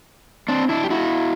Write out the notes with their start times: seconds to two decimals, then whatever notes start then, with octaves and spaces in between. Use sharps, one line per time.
0.48 C4 D4
0.69 D4 E4
0.84 G4
0.90 E4 F#4